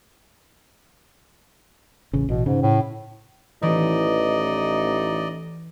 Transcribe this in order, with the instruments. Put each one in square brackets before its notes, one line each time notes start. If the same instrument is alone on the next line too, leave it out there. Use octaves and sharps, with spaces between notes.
[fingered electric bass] A1 C#3
[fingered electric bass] A1 [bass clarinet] B2
[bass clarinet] G#2 [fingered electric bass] C#3
[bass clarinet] A2
[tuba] A1 [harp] E3 [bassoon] D#4 [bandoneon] D5 D#5